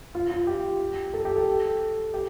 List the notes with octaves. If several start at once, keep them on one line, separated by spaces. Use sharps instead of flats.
F4
F4
G4
A4
G4
A4
G4